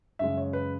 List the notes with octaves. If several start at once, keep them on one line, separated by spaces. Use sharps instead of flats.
F#2 C#3 G#3 E5
C#5
B4